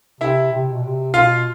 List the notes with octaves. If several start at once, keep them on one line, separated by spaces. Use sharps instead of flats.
C3 E4 E5
C3
B2
C3
B2 F4 F5